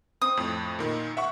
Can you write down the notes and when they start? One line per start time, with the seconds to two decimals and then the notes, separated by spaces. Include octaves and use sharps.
0.21 C4 D#6
0.37 F2 A2
0.79 A#2 D#3
1.17 E5 F#5 C#6